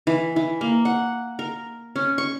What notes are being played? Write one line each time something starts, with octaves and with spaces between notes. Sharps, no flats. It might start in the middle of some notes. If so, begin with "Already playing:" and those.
E3
E3
A#3
F#5
A#4
C#4
C#6